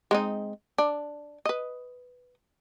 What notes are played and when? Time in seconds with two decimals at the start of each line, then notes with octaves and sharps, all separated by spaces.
0.11 G#3 C4 D#4
0.78 D4
1.45 B4 D#5